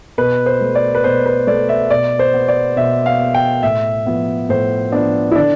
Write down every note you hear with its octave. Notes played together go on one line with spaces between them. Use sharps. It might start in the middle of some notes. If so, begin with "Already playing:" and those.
B2 B4
C5
A3
D5
B4
B2 C5
B4
A3 D5
E5
B2 D5
C5
B3
D5
B2 E5
F5
B3
G5
A2 E5
F3 B3
A2 C5
F3 B3 D4
E4
D3 D4